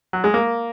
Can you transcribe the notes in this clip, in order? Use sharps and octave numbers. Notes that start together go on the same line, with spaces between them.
F#3
G#3
A#3